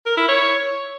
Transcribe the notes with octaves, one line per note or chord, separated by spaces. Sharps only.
A#4
E4
C#5